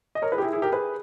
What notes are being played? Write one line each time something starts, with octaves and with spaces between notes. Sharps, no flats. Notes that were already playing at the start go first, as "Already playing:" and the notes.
D#5
A#4 C#5
G#4 B4
G4
E4 G#4
E4 G#4
G4 A#4
G#4 B4